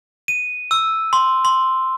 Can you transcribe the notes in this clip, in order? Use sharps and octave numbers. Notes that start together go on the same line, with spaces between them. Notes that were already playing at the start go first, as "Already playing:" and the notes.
D#7
E6
C6
C6